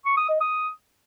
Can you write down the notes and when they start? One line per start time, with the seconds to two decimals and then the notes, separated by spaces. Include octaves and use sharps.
0.05 C#6
0.17 D#6
0.29 D#5
0.41 D#6